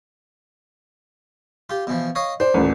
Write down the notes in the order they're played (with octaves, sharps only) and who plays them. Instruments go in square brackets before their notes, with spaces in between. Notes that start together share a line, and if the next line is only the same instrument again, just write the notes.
[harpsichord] F4 G4
B2 E3 F3
C#5 D#5 F5
[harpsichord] D4 [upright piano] C5
[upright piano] D#1 A1